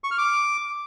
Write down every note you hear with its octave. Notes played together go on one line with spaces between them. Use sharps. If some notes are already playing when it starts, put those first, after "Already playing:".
C#6
F6
D6